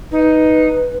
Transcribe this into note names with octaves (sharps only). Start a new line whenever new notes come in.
D#4 B4